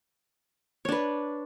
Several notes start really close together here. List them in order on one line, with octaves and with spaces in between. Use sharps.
C#5 D4 B4